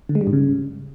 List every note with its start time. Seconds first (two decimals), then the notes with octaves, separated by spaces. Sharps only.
0.09 D3
0.15 G#3
0.21 G3
0.27 G#2
0.33 C#3